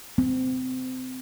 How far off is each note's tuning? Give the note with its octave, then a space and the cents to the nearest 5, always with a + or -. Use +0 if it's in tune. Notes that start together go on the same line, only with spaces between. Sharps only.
C4 -30